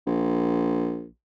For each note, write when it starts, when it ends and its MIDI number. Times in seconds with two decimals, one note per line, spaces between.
0.06 1.07 34